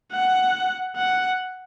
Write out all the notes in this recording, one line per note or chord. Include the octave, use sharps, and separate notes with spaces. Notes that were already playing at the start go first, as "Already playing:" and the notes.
F#5
F#5